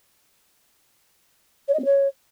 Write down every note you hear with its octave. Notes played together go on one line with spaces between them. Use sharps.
C#5
D#5
C4
C#5